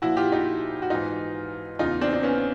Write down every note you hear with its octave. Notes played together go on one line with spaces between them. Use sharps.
A#2 F3 E4 F#4
F4 G4
D#4 F4
F#4
G#2 E3 D#4 F4
E2 C#3 E3 D#4 F4
C4 D4
D4
B3 C#4